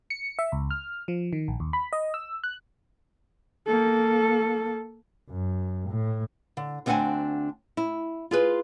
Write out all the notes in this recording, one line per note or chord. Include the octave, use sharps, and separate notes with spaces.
C#7
E5
C#2
F6
F3
D#3
A#1
D#2
B5
D#5
E6
F#6
A#3 A4
F#2
A2
D3
D2 B3 C4 D4 F#5 G#5
E4
F4 G#4 B4